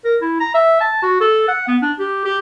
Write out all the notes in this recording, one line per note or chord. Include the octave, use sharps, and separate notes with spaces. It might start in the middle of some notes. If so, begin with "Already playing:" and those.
A#4
E4
A#5
E5
A5
F#4
A4
F#5
B3
D4
G4
G4